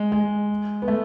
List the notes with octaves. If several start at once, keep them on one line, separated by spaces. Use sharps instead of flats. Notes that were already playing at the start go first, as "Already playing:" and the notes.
Already playing: G#3
G#3
B3
A3